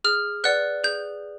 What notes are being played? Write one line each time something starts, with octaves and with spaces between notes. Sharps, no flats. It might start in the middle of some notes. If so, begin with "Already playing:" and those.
G#4 F6
B4 D5 F#5 F#6
G#4 G6